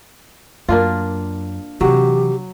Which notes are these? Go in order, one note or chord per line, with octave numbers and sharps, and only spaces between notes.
F#2 A#3 D4 F4
C3 E3 F#3 G4